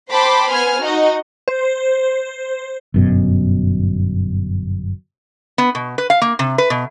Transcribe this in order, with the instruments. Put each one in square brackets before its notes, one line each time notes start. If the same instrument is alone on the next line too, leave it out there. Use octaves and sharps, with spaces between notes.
[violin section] C5 G5 A5 B5 C6 D6
B3 C5 G#5 F6
D#4 F#4 D#5
[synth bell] C5
[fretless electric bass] G1 F#2 B2
[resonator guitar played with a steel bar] B3
B2
B4
F5
A#3
C3
B4
B2